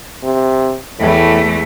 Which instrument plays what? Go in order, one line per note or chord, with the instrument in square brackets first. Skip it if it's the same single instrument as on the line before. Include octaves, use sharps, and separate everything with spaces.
[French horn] C3
[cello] E2 A3 [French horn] A2